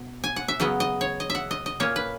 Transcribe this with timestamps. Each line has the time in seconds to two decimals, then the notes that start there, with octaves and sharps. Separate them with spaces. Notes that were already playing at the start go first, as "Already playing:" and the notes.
Already playing: B2
0.24 G#5
0.36 F#5
0.48 E5
0.60 C#3 F#3 B3 D#5
0.80 D#5
1.01 C#5
1.20 D#5
1.30 E5
1.35 F#5
1.51 D#5
1.66 D#5
1.80 A#2 A#3 C#4 C#5
1.96 B4